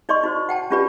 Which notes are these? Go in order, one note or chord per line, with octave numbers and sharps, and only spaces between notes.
D#4 D5 D#5 C6 C#6
D#4 F#4 C5
F#5 G5 A5
C#4 D4 F4 G4 B4 D5